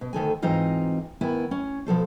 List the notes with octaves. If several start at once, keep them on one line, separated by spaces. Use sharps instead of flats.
B2
D2 D#3 A4 G#5
G#2 E3 C4 D#4 F4 D#5
D#3 B3 E4 G#5
C#4
B2 F3 A4 C5